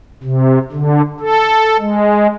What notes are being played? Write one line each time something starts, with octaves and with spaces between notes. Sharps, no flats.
C3
D3
A4
G#3